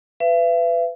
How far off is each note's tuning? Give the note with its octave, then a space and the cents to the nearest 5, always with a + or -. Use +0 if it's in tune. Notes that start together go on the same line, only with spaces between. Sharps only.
B4 +25 E5 +45